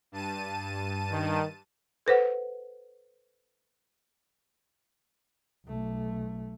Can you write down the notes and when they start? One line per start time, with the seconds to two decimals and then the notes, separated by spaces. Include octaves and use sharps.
0.12 G2 A5 D#7
1.11 D#3
2.06 A4 B4 C5 F#5
5.66 B1 A3